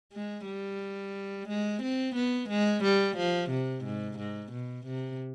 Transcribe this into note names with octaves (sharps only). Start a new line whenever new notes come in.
G#3
G3
G#3
C4
B3
G#3
G3
F3
C3
G#2
G#2
B2
C3